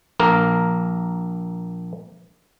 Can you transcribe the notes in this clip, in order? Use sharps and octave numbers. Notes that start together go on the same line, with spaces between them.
A#1 A#3 A#4